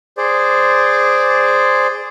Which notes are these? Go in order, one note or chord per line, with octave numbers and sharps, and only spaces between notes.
G#4 C5 D5